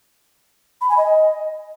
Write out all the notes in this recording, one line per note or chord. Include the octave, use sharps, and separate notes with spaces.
B5
G#5
D#5